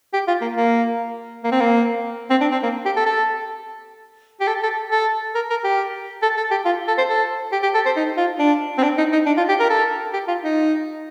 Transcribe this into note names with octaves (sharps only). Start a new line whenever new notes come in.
G4
F4
A#3
A#3
A#3
C4
A#3
C4
D4
C4
A#3
G4
A4
A4
G4
A4
A4
A4
A#4
A#4
G4
A4
A4
G4
F4
A4
C5
A4
G4
G4
A4
C5
D#4
F4
D4
C4
D4
D#4
D#4
D4
F4
G4
A#4
A4
G4
F4
D#4